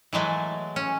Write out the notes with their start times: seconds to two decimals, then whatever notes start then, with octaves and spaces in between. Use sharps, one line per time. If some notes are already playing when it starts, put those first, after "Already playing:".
0.13 E3 F#3 G#3 A3
0.76 C#4